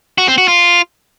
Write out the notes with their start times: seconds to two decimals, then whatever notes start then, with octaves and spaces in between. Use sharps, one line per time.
0.18 F#4
0.28 C4
0.38 F#4
0.48 F4